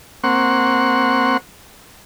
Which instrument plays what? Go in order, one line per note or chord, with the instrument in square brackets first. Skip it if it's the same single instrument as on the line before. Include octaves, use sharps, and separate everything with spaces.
[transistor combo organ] A#3 C4 F#5 C6 C#6